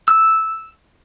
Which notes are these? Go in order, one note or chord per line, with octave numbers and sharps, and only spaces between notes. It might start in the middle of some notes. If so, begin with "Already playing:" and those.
E6